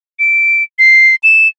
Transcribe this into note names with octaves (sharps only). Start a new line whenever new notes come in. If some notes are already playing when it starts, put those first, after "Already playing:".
D7
C7
E7